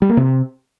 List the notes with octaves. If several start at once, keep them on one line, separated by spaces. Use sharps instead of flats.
G3
A#3
C3